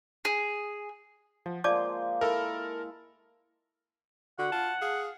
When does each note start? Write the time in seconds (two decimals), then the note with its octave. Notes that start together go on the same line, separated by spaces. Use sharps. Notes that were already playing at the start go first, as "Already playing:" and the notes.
0.25 G#4
1.46 F3 F#5
1.64 F3 G#3 A#3 D5 A5 D6 G6
2.21 E4 A4 A#4
4.39 D3 F#4 F#5
4.52 F4 A5
4.82 G#4 F5